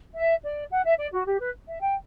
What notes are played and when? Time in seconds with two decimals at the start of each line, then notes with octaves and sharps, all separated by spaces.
0.16 E5
0.44 D5
0.71 F#5
0.84 E5
0.99 D5
1.12 F#4
1.26 G4
1.39 B4
1.68 E5
1.81 G5